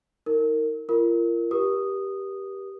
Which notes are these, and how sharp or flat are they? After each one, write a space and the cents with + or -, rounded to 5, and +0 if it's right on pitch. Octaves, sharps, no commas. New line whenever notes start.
D#4 +40 A#4 -20
F4 -35 A#4 -10
G4 +0 A#4 +45 D#6 -10